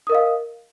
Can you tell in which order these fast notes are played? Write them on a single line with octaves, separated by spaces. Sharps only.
D#6 A#4 D#5 F5